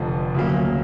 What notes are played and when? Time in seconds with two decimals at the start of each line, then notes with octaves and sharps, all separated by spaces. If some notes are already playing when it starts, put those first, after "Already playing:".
Already playing: F1 F2 D3 F3
0.35 D2 C#3 F#3 A#3